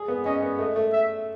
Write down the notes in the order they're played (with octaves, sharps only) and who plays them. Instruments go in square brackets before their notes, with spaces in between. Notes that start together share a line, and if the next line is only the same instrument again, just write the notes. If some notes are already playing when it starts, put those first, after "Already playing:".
Already playing: [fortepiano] G#4
B3
[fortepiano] C#4 [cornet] D#5
[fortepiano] B3
[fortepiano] A3 [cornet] D#5
[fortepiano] A3
[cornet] E5